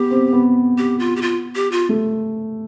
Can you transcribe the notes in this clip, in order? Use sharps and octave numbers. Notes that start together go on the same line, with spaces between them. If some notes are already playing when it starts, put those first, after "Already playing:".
Already playing: B3 G4
C4
B3
G4
F4
G4
F4
G4
F4
A3